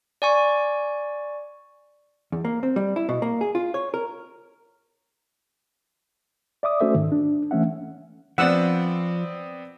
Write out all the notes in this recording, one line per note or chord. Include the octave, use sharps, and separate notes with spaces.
D5 G#5 C#6
E2
A#3
C4
G3
E4
B2
A#3
G#4
F4
C#5
A#4
D5 E5 D6 D#6
A3 C#4 F#4 A4 C5 E5
G#2 D#3
D4
E3 A3 C#4 E5 F#5
F3 B3 C4 D5 F#5 E6